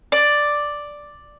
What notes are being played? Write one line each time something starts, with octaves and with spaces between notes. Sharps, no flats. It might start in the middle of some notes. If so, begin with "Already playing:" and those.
D5